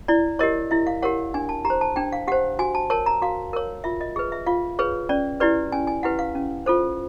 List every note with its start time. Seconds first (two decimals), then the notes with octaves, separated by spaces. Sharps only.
0.08 E4 D5
0.39 G4 A#4 C#5 D#5
0.71 E4 E5
0.87 F5
1.02 G4 A#4 C#5 F#5
1.34 D4 G#5
1.49 A5
1.65 G4 A#5
1.70 C5
1.81 A5
1.96 D4 G5
2.12 F5
2.28 G4 C5 F#5
2.59 F#4 G#5
2.75 A5
2.90 A#4 C#5 A5
3.06 A#5
3.22 F#4 F5
3.53 A#4 C#5
3.84 F4 E5
4.01 D#5
4.16 G#4 B4
4.32 E5
4.46 F4 F5
4.79 G#4 B4 C#5
5.09 C#4 D5
5.40 E4 G4 B4 D5
5.72 C#4 G#5
5.87 G#5
6.03 E4 G4 B4 F#5
6.19 F5
6.35 C#4
6.66 F4 A4 C5